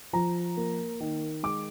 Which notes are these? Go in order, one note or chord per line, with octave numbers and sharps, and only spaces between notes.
F3 A#5
A#3
D#3
G#3 D6